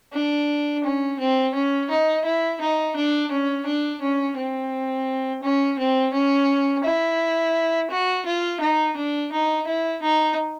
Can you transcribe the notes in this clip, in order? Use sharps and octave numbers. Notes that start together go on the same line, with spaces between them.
D4
C#4
C4
C#4
D#4
E4
D#4
D4
C#4
D4
C#4
C4
C#4
C4
C#4
E4
F#4
F4
D#4
D4
D#4
E4
D#4